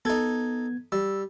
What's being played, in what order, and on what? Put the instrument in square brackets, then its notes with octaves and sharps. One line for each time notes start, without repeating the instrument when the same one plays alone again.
[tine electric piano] B3 G#6 [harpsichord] D#4 A4
[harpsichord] G3 [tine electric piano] E6